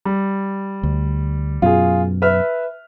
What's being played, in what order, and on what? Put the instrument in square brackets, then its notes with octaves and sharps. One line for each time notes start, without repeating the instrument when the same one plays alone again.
[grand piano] G3
[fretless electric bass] D2
[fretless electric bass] F#2 B2 [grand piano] F4 G#4
[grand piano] B4 E5 F6